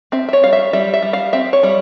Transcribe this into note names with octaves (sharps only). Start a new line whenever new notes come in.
C4 E5
E5
C#5
G3 F5
E5
G3 E5
E5
G3
F5
C4 E5
C#5
G3